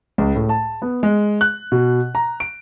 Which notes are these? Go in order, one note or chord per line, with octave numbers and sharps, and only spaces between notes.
C#2
A2
A5
B3
G#3
F#6
B2
A#5
D7